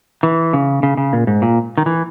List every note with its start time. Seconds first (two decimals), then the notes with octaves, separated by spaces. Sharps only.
0.23 E3
0.53 C#3
0.83 C#3
0.97 C#3
1.13 A#2
1.27 G#2
1.42 A#2
1.77 D#3
1.86 E3